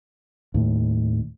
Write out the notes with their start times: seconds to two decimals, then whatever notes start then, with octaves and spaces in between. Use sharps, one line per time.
0.54 D#2 A2